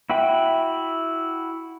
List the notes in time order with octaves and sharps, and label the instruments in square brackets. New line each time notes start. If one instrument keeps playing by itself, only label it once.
[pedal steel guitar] E4 F#4 E5 G5 B5